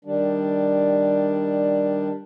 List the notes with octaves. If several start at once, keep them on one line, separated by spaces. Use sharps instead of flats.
D#3 G3 D4